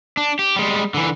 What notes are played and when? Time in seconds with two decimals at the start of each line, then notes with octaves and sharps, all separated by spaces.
0.17 D4
0.39 G4
0.56 G3 G#3
0.94 D3 E3